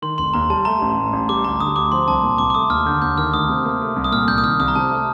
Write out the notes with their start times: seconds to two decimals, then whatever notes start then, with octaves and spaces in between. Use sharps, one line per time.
0.02 D#3 C6
0.18 F1 C6
0.34 D#2 A#5
0.50 G3 A5
0.65 A3 A#5
0.82 A1
0.97 A2
1.13 A1
1.29 G3 D6
1.44 D2 A#5
1.60 D3 D#6
1.76 D2 D6
1.92 F3 C6
2.08 C2 A5
2.23 A#2
2.38 C2 D6
2.50 D6
2.54 A3 D#6
2.70 D#2 F6
2.86 D3 G6
3.02 D#2 G6
3.18 D#3 F6
3.33 D2 D#6
3.49 C3
3.65 A#3
3.81 A3
3.96 C2
4.04 D#6
4.12 A#2 F6
4.27 C2 G6
4.38 D#6
4.43 D#3 F6
4.60 C2 D#6
4.68 A#5
4.76 C3 A5
4.91 A3